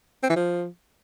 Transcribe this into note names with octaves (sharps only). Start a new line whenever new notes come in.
C4
E3
F3